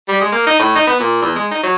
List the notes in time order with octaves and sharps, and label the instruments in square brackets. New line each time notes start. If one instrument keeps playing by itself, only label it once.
[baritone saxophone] G3
G#3
A#3
D#4
A2
D#4
B3
A#2
E2
G#3
D#4
F#3